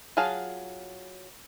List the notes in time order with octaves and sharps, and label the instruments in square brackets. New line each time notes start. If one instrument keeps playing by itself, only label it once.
[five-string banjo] F#3 F4 G#4 F5 A5